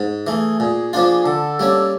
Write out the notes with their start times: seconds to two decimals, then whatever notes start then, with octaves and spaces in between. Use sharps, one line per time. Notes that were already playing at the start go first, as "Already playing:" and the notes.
Already playing: G#2
0.27 E3 A3 G#4
0.60 A#2 G#4
0.93 F3 A#3 D4 F4
1.25 D3 A4
1.59 G3 A#3 C#4